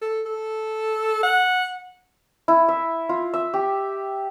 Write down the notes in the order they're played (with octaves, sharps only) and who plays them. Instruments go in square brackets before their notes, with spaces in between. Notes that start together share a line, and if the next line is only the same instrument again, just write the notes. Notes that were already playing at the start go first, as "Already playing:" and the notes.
[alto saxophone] A4
A4
F#5
[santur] E4
E5
F4
E5
G4